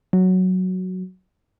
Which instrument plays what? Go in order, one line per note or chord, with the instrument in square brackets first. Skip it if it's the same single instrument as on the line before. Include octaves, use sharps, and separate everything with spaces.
[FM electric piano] F#3